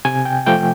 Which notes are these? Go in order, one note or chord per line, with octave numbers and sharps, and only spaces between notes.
C3 G#5
G5
F3 A3 G5